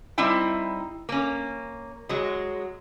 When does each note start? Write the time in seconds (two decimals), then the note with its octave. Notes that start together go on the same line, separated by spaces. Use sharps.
0.18 G3 C4 D#4 E4 G5
1.09 A#3 C#4
2.09 F#3 G#3